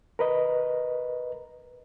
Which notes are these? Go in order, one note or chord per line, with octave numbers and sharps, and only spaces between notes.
A#4 B4 D#5